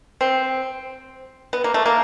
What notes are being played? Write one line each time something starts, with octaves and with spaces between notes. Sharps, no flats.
C4
B3
A#3
A3
A#3